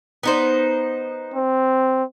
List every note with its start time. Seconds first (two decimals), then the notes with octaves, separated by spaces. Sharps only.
0.23 B3 D#4 C5
1.34 C4